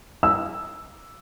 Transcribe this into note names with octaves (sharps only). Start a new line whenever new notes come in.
E6